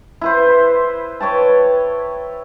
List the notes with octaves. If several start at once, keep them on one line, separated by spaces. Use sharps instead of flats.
E4 B4 C5
B4 C#5 G5 A5